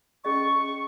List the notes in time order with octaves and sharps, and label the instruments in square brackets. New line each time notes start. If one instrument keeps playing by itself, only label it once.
[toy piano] C#4 G#4 D#5 [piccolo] C#6